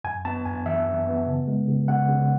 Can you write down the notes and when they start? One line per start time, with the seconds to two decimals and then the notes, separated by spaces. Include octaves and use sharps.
0.04 F#2 G#5
0.25 B3 A5
0.45 F#2 G#5
0.66 E3 E5
0.86 F#2
1.07 B3
1.27 C#3
1.48 G#3
1.68 C#3
1.88 C#3 F#5
2.09 C#3